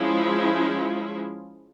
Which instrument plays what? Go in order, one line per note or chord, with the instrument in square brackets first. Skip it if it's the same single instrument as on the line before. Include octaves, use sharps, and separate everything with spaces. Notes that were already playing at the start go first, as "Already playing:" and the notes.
Already playing: [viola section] F3 G#3 C#4 E4